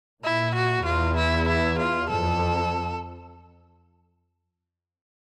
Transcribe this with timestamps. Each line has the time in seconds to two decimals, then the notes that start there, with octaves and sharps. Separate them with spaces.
0.23 A#2 E4
0.55 F#4
0.85 E2 F4
1.17 E4
1.48 E4
1.79 F4
2.10 F2 A4